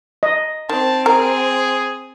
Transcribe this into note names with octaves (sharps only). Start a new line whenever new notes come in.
D#5
D#3 C4 A5
G#4 A#4